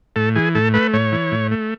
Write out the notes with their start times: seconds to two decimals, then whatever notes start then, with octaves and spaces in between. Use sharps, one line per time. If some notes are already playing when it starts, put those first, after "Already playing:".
0.16 A2 A4
0.35 E3 G#4
0.55 A2 A4
0.74 A3 B4
0.93 A2 C#5
1.12 E3
1.32 A2
1.51 A3